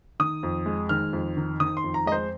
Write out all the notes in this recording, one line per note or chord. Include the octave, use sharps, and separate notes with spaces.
D#3 D#6
F2
G#3
D#3 F6
F2
D#3
D#3 D#6
C6
F2
A#5
G#3 D#5
C5